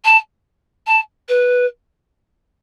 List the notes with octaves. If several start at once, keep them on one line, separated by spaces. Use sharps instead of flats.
A5
A5
B4